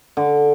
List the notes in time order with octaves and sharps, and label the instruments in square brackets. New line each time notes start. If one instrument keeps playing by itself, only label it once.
[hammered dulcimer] D3